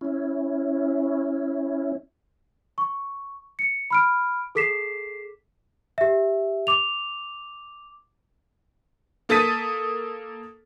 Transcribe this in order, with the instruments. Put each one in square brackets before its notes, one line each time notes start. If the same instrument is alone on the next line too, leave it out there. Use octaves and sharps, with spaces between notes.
[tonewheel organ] C#4 E4
[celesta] C#6
C#7
B5 F6 D7
G#4 A4 D6 B6 C7 E7
G4 E5
D6 F7
[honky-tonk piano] A#3 A4 D#6 A6 B6 D#7